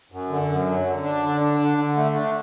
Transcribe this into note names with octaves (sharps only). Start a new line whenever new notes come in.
F#2
D3
F#2
F#3
D3
D4
D3
D4
D3
D3
A3
D4